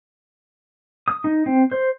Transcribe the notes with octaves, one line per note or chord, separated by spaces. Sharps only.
D#6
D#4
C4
C5